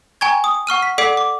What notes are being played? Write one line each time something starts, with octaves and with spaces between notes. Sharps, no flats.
G5 G#5 A#5 C#6 G#6
D#6
F#5 C#6 F6 D#7
B6
A4 D5 F#5 D6 B6 D7
D6